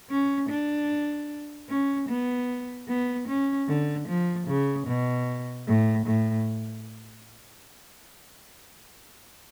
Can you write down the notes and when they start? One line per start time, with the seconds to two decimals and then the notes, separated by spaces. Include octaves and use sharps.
0.10 C#4
0.49 D4
1.69 C#4
2.09 B3
2.88 B3
3.28 C#4
3.68 D3
4.08 F3
4.47 C#3
4.87 B2
5.67 A2
6.06 A2